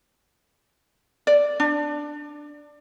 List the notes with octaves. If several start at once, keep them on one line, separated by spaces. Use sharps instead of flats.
D5
D4